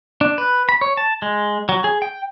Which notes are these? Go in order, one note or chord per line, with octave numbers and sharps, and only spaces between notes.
D4
B4
B5
C#5
A5
G#3
F#3
G#4
G5